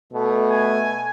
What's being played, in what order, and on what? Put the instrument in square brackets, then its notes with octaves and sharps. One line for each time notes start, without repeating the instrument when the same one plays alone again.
[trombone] B2 [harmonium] A3
[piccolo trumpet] G#5